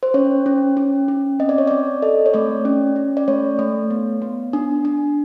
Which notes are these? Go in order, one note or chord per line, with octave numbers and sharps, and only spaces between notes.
C5
C#4 C#5
C#4
C#4
C#4
C4 D#5
D5
C#5
C4 D5
A4 D#5
C#5
A3 D5
C#4
C#4
D5
A3 C#5
A3
B3
B3
D4
D4